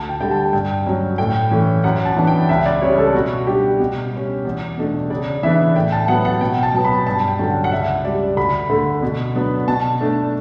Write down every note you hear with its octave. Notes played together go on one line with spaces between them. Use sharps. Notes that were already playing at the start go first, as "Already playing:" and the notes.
Already playing: D2 A5
G5
D3 G3 G5
A5
G2 G5
F#3 C#4
A2 G5
E3 A3 C#4
F#2 F#5
A5
E3 B3 D4
G5
C#2 E5
D5
C#3 G3 C#4 C#5
A4
B2 F#4
G3 D4 G4
B2
G3 C#4
E2
B2 A3 D4
C#3 D5
E3 B3 D4 E5
A2 G5
A5
F#3 B3 F#5
F#5
B2 G5
A5
F#3 B3
B5
G2 A5
G5
D3 F#3 C#4
F#5
F#5
C#2 E5
C#3 G3 D5
D2 B5
D3 A3
B2
F#3 B3 D4
B2 A5
A3 D4